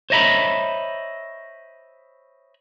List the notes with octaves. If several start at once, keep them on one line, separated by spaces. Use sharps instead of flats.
C5 C#5 D#5 E5 A#5 B5